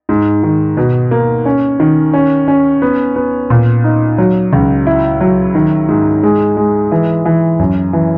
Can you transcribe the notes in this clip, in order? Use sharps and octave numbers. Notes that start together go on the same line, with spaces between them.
G#2
D#3
B2
A#3
C#4
D#3
C#4
C#4
B3
B3
A#2
D#4
F#3
C#2
E4
F#3
D#3
G#2
G#3
G#3
E3
E3
F#2
E3